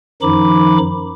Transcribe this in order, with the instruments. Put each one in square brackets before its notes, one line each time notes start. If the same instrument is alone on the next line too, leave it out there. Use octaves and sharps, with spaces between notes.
[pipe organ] F#2 D#3 F3 D#4 B5 D6